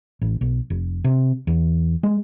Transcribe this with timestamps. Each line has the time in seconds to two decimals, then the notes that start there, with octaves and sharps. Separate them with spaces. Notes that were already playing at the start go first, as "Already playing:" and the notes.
0.22 A1
0.41 B1
0.70 F1
1.04 C3
1.47 E2
2.03 G#3